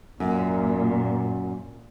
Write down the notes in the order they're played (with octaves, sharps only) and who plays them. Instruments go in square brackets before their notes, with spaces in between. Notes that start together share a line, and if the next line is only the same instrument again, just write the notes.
[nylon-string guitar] F#2 [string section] A#2